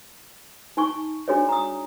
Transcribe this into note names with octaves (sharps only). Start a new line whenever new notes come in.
D#4 G#5 C#6
D4 F#4 G#4 C#5 D5
A#5 D#6